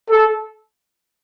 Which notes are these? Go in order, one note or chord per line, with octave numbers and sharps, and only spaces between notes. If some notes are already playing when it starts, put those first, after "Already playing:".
A4